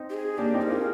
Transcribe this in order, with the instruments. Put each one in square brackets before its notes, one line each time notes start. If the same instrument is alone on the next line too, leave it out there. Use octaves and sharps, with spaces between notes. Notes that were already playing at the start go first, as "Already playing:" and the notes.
Already playing: [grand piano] C4 D#4
[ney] G4
G#4
[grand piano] A#3 D4 [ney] G4
[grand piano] C4 D#4
[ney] A#4
[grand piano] F4 G#4